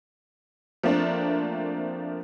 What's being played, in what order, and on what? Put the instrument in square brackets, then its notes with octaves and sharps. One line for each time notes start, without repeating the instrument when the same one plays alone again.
[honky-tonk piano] F3 A3 A#3 C4 D4